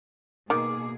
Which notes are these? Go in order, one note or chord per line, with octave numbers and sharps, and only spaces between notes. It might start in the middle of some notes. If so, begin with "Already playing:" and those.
B2 D#3 A#3 G#4 D6